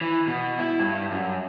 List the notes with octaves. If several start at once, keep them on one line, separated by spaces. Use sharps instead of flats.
E3
B2
E4
G2
F#2